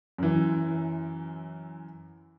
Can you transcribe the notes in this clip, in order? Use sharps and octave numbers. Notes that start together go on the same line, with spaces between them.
F#2 E3